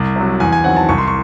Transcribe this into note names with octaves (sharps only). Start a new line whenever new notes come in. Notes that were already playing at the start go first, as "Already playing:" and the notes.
Already playing: C2
C3 F#3
E2 G#5
G#5
D#3 F#3 C4 F#5
A5
C2 C#6
C6
C#6